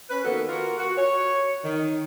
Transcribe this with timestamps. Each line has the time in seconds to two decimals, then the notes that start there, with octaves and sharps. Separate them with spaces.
0.10 C#4 B4
0.24 D#3 A#3 B3 F#4 A4
0.49 A#3 F4 F#4 A#4
0.78 F#4
0.97 C#5
1.64 D#3